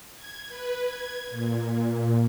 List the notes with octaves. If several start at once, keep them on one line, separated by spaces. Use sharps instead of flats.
G#6
B4
G#6
A#2
A#2